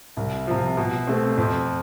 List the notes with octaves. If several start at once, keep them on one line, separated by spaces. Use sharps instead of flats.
C2
C3 F3
B2
A3 C4
F2